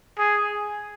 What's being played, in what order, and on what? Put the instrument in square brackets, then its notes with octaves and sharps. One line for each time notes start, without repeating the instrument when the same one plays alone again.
[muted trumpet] G#4